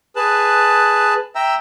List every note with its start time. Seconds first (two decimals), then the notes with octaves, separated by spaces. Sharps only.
0.16 G#4 B4 A5 F#6
1.35 E5 G5 A#5 E6